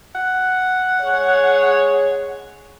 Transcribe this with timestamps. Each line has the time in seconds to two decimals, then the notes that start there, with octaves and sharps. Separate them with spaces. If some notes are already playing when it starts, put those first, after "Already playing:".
0.15 F#5
1.01 G#3 G#4 C#5